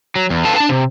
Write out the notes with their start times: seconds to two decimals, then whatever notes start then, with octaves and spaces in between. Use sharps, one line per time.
0.16 F#3
0.30 E2
0.45 A4 B4 F5 G5 A5
0.56 D4 A5
0.69 C3